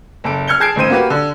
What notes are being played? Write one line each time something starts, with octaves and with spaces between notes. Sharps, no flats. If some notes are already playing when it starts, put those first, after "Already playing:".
F#1 A4 D7
F6 G#6 C#7 G7
G#4 A5 G#6 C7 D7
A1 D#3 C5 D#7
A#3 F#4 G4 B4
D3